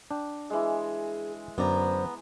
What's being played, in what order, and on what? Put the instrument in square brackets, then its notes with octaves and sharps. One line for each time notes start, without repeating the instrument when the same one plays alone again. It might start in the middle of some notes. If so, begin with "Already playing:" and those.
[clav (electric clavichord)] D4 G5
[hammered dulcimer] E3 G#3 [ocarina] G#4
[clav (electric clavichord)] F#2 D3 D5 [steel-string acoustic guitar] B3 A#5 [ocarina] C5